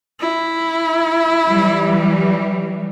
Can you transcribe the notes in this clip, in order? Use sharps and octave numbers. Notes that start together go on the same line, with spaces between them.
E4
E3 F#3 G3